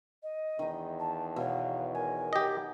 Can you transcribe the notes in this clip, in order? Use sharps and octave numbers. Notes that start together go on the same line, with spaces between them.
D#5
E2 D#3 D#4
A5
B2 C#5 F5
A#4 G#5
G4 D#5